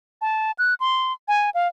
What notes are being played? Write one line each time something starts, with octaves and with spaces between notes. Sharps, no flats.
A5
F#6
C6
G#5
F5